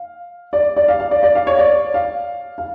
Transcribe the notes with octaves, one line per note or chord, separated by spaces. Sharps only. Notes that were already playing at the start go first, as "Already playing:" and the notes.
Already playing: F5
D5
D5
F5
F5
D5
D5
F5
C#5
D5
F5
F5